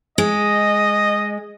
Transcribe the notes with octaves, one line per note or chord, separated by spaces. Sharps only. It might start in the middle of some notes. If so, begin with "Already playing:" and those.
G#3 D#5